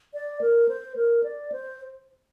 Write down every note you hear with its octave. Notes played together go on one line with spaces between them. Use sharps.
D5
A#4
C5
A#4
D5
C5